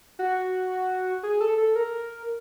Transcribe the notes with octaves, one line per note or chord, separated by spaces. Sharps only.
F#4
G#4
A4
A4
A#4